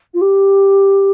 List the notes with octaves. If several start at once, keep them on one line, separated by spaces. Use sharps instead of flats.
F4
G4